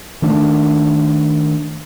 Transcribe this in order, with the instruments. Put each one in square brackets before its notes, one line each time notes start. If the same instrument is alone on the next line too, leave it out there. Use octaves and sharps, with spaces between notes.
[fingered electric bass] D#3 A3 D4